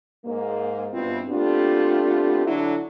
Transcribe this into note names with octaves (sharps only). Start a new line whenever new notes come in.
G#2 A#3
G2 B2 B3 C4 E4 F4
A3 B3 C4 D4 F4 G4
D3 F#3 D4 E4